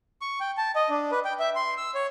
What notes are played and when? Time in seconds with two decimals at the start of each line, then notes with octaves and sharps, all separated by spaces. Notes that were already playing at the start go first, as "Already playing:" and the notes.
0.22 C#6
0.40 G5
0.57 A5
0.76 D#5
0.89 D4
1.11 B4
1.25 G5
1.39 E5
1.55 C6
1.77 E6
1.95 C#5